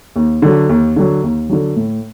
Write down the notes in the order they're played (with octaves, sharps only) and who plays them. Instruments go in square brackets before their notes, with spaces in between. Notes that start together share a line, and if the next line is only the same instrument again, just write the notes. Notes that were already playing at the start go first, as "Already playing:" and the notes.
[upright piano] D#2
D3 F#3
D#2
D3 F#3
D#2
D3 F#3
A2